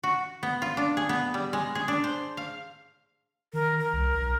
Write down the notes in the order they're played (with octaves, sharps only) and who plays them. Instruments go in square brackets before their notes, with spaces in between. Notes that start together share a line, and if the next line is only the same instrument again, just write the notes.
[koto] F#4
B3
F4
D4
G#4
B3
G3
G#3
G#4
D4
C5
F5
[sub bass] D#3 [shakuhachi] A#4
[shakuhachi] A#4
[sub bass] C2
B1